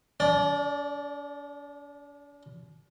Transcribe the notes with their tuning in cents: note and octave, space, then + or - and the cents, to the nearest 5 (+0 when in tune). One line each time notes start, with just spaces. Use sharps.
D4 -45 D5 +0